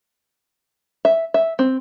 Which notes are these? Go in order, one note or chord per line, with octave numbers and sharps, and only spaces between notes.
E5
E5
C4